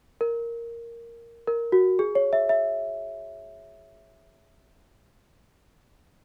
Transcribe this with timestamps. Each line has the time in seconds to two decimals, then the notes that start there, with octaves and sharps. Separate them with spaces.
0.21 A#4
1.47 A#4
1.72 F#4
1.99 G#4
2.15 C#5
2.33 E5
2.49 E5